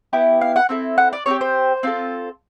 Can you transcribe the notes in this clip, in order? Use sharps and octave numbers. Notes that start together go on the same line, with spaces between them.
B3 E4 G4
F5
F#5
C4 E4 A4
F#5
D5
C4 D#4 G4 C#5
C5
C4 F4 A4